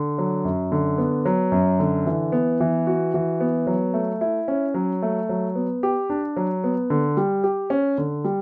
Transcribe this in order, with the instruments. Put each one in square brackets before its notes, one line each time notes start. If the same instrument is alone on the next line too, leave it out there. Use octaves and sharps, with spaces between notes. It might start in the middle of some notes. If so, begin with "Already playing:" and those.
Already playing: [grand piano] D3
F#3
F#2
D3
B3
F#3
F#2
D3
E3
B3
E3
F#4
E3
B3
F#3
A3
E4
C#4
F#3
A3
F#3
B3
G4
D4
F#3
B3
D3
G3
G4
C#4
D3
G3